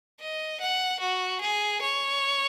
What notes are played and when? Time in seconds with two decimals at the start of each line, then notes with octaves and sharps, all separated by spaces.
0.20 D#5
0.60 F#5
1.00 F#4
1.41 G#4
1.81 C#5